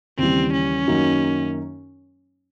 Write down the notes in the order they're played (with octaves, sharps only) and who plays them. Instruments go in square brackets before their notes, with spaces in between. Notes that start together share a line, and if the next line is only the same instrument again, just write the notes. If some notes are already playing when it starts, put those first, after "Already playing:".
[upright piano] D#2 C#3 E3 G3 [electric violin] C4
[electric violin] C#4
[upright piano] F#2 D#3 F#3 A#3 D#4